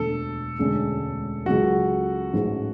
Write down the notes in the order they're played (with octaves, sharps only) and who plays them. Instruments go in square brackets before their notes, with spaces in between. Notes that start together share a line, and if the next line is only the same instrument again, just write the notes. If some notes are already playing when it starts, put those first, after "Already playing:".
Already playing: [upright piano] E1 D2 D3 [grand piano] A4
[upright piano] E1 D2 D3 G#3 C#4
[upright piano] C#2 C#3 F#3 [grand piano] F#4
[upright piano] A1 G#2 G#3